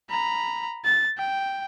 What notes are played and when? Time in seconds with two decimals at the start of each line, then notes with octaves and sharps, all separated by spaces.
0.10 A#5 B5
0.85 A6
1.18 G5